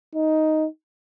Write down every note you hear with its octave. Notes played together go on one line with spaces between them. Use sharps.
D#4